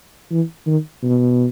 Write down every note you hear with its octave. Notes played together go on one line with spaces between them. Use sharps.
E3
D#3
B2